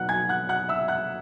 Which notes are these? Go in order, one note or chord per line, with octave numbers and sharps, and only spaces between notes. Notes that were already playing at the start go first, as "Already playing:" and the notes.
Already playing: B2 F#3 B3 D#4 F#5 F#6
G#5 G#6
F#5 F#6
F#5 F#6
E5 E6
F#5 F#6